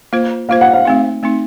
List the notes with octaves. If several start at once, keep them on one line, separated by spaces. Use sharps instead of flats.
A#3 F4 C5
A#3 F4 C5 F5
F#5
F5
A3 C4 D#4
A3 C4 D#4